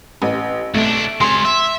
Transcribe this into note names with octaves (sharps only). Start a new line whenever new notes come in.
A1
B1 A3 D4
G#3 C#5 C6
E5